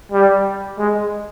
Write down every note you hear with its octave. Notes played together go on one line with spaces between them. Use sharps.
G3
G#3